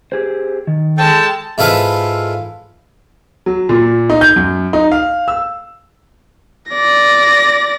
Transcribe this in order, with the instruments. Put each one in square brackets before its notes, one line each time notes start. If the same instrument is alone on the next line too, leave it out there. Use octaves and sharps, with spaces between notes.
[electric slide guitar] G4 G#4 C5
D#3
[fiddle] G#3 A5 [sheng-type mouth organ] A4 G5
[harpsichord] G#2 E4 F4 A4 B4 F5
[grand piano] F#3
A#2
D#4
G6
F#2
D#4
F5
E6
[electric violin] D5 A#6